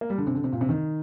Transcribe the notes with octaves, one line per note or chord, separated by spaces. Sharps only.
A#3
G3
D3
C3
D3
C3
A#2
C3
D#3